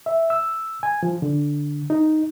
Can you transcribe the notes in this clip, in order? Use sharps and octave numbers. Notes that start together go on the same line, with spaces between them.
E5
E6
G#5
F3
D3
D#4